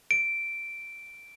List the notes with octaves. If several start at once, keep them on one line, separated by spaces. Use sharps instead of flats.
D7